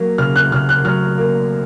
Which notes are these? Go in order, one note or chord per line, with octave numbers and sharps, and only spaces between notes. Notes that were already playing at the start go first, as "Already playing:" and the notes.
Already playing: F#3 A#3
C#3 F6
F#6
C#3 F6
F#6
F#3 F6
A#3